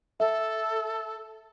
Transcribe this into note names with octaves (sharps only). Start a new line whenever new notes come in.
A4 E5